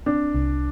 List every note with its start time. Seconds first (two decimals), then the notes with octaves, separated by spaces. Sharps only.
0.06 C4 D4
0.34 C2